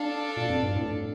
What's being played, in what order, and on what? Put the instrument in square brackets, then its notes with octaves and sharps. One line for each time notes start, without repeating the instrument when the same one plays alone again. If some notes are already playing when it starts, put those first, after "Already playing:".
Already playing: [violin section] D4 A4 D5 F5
[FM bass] A#2
F2
G2
A2